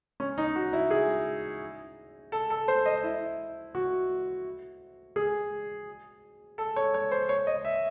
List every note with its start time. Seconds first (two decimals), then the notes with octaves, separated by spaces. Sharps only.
0.20 C#4
0.38 D#4
0.56 F#4
0.73 E4
0.91 G#4
2.32 A4
2.50 A4
2.68 C5
2.86 D#5
3.03 E4
3.75 F#4
5.16 G#4
6.58 A4
6.76 C#5
6.94 C#5
7.12 C5
7.29 C#5
7.47 D#5
7.65 E5